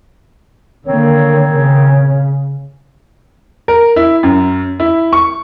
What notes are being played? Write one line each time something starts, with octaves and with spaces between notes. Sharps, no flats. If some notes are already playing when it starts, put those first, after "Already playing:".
D3 D#3 A#3 C4 C#5
C#3
A#4
E4
F#2
E4
C#6